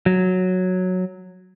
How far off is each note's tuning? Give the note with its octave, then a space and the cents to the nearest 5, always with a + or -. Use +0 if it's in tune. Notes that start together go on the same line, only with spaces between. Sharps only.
F#3 -5